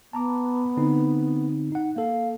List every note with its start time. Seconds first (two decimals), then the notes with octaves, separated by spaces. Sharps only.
0.13 B3 A5 A#5 D6
0.77 D3 C4 D#4
1.72 D#4 F#5
1.96 A#3 A4 F5